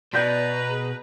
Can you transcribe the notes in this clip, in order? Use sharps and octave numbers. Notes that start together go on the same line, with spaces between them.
B2 B4 D5 A#5 G6 A#6 B6
G#4